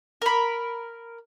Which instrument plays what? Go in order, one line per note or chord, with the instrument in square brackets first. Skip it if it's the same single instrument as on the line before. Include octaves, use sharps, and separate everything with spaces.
[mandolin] A#4 B5